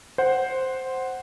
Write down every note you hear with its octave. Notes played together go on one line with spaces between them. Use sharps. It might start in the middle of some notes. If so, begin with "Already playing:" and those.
C5 F#5